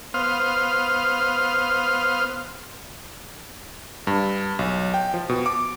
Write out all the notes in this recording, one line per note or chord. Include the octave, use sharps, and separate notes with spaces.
B3 C5 F5 C6 D#6 F6
G2
B1
G5
F3
B2
D6